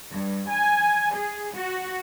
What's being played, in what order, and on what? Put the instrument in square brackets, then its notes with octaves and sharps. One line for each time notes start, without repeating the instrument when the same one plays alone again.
[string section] G2
G#5
G#4
F#4